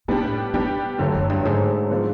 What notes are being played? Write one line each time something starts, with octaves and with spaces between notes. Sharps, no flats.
A#2 G3 B3 D4 G4
A2
B2 G3 B3 D4 G4
G2 D3 F#3 A3
F#2
G2
G#2 D3 F#3 A3
F3 G#3 B3 D4 F4